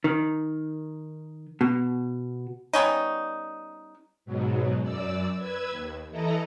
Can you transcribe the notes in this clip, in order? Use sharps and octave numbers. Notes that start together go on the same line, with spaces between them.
D#3
B2
G3 B3 C#4 D#4
G#2 B2 F#3
F#2 D5 E6
B4 E6 G#6
D#2
E3 E4 A4 D#5 A#5